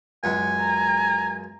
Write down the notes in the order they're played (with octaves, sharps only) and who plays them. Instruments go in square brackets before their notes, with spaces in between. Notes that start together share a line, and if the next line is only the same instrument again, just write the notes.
[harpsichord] C#2 F#2 [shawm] G#5
[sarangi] A#5